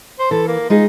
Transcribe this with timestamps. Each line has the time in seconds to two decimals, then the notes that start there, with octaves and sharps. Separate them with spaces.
0.19 C5
0.31 E3 A4
0.47 A#3
0.70 G#3 D#4 F4 G#4